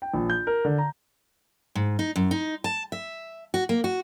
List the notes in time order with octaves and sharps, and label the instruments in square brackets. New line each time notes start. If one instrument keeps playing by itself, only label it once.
[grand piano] G5
A#1
G6
A#4
D3
A#5
[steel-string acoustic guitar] G#2
D#4
F#2
D#4
A5
E5
F#4
A#3
F#4